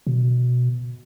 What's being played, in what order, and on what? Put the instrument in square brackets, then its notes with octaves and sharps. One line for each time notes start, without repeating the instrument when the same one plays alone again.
[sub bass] B2